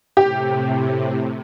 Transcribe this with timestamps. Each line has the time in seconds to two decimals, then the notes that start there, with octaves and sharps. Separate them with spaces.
0.17 A2 C3 G4